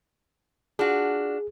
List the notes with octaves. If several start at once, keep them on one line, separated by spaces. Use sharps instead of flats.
D4 F4 F#4 G#4